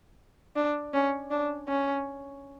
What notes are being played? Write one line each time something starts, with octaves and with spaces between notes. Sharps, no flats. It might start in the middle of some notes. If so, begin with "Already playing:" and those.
D4
C#4
D4
C#4